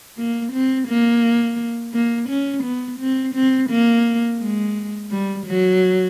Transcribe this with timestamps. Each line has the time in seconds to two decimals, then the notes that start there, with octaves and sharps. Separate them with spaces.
0.18 A#3
0.53 C4
0.88 A#3
1.93 A#3
2.29 C#4
2.63 B3
3.00 C4
3.35 C4
3.70 A#3
4.40 G#3
5.11 G3
5.46 F#3